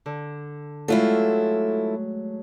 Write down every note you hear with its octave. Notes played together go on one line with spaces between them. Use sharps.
D3
F#3 G#3 A3 E4 F4 A4